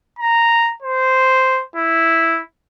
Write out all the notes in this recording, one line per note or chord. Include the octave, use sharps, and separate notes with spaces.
A#5
C5
E4